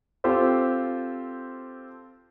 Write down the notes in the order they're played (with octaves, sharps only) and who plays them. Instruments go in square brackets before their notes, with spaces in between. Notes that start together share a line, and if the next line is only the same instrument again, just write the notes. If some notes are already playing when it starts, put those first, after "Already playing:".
[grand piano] C4 F4 G4 A4 C5